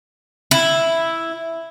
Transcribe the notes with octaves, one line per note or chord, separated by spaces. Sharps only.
E4